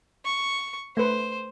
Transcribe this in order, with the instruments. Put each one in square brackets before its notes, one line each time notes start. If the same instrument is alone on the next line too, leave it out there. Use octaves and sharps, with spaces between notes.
[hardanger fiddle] C#6
[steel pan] A3 B4 [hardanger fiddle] C5